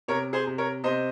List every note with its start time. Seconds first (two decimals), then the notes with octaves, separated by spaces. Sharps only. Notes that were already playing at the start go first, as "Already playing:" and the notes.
0.08 C3 A#4 C#5
0.33 G#4 C5
0.46 C3
0.58 A#4 C#5
0.84 C3 C5 D#5